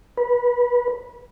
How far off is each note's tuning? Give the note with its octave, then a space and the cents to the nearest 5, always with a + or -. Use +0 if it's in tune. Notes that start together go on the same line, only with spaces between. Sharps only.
B4 -25